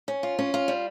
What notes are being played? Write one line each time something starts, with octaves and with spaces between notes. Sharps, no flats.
C#4
F4
C#4
F4
G3